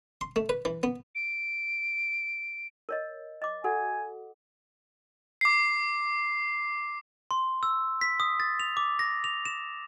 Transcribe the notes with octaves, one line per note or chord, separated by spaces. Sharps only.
C6
A3
B4
E3
B3
D7
A#4 C#5 D#5
D#5 D6
F#4 A4 F#5 G#5
D6 C7
C6
E6
B6
D#6
A6
F7
D6
A#6
F7
E7